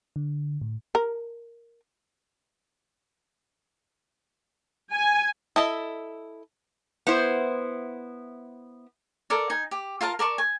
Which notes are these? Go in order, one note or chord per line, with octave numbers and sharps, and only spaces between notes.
D3
A2
A#4
G#5
E4 A4 D#5
B3 E4 C5
A4 A#4 D5
D#4 G#5
G4
F4 A#4 F5 A5
A#4 D5 A5 C#6
G#5